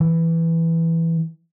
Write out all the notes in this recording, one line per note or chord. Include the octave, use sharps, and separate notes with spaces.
E3